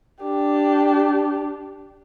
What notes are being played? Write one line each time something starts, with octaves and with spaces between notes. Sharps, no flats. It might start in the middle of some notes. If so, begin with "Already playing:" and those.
D4 G4